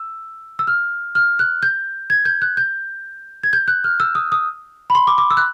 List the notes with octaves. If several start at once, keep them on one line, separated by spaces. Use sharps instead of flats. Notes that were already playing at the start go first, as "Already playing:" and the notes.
Already playing: E6
E6
F6
F6
F#6
G6
G#6
G6
F#6
G6
G#6
G6
F#6
F6
E6
D#6
D#6
B5
C6
D6
D6
E6
F#6